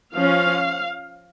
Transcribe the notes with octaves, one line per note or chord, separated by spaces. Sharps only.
F3 C#4 F5